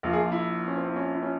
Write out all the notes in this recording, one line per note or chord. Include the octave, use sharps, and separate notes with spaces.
A#1 A#2 F3 F4
G#4
F4
E4
C#4
C4
E4
C#4
E4
C#4